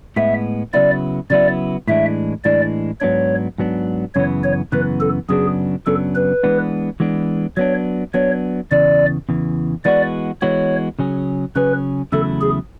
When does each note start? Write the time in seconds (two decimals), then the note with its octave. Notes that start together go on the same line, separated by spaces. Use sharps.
0.16 A2 G#3 B3 E5
0.73 C#3 F#3 B3 E4 D5
1.30 C#3 F#3 B3 E4 D5
1.88 A2 E3 G#3 D4 E5
2.44 A2 E3 G#3 D4 D5
3.01 G#2 F#3 B3 D4 C#5
3.58 G#2 F#3 B3 D4
4.15 F#2 C#3 E3 B3 C#5
4.44 C#5
4.72 F#2 C#3 E3 B3 B4
5.01 A4
5.29 F#2 C#3 F#3 B3 D4 G#4
5.86 F#2 C#3 F#3 B3 D4 A4
6.15 B4
6.43 E3 G#3 B3 D4
7.00 E3 G#3 B3 D4
7.57 F#3 B3 D4 C#5
8.14 F#3 B3 D4 C#5
8.71 E2 C#3 E3 D5
9.29 E2 C#3 E3
9.85 E3 G#3 B3 F#4 D5
10.42 E3 G#3 B3 F#4 C#5
10.99 C#3 F#3 C#4 G#4
11.56 C#3 F#3 C#4 G#4 B4
12.12 E2 C#3 F#3 A3 E4 A4
12.41 G#4